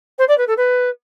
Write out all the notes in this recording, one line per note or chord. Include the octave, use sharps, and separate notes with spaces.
C5
D5
B4
A4
B4